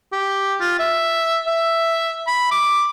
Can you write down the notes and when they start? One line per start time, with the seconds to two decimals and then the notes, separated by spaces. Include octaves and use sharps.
0.12 G4
0.60 F4
0.79 E5
1.47 E5
2.27 B5
2.51 D6